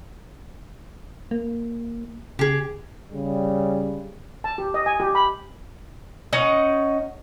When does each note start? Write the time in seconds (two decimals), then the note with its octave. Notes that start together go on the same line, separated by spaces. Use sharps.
1.31 A#3
2.39 C#3 G4 G#4
3.12 C#3 G3
4.44 A5
4.58 G4
4.74 D#5
4.86 G#5
5.00 G4
5.15 B5
6.33 C#4 D#4 D#5 F#5